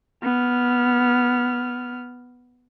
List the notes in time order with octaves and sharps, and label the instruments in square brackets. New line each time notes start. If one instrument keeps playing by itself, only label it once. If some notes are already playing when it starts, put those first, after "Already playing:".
[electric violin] B3 F6